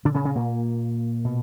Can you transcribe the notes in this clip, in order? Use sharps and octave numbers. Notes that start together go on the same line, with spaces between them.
A#2 D3 D4
C#3 C#4
C#3 C#4
A#2 A#3
B2